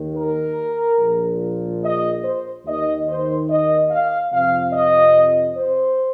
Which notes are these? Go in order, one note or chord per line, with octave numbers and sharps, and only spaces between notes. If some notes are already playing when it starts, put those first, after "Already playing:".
Already playing: D#2 D#3
A#4
A#1 A#2 F3
D#5
C5
D#2 D#3 D#5
C5
D#5
F5
F2 C3 F3 F5
D#5
C5